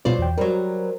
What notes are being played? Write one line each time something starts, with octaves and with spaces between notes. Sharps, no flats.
B2 F#3 F4 B4 C5 D5
E2 G5
F#3 G3 A#4 C5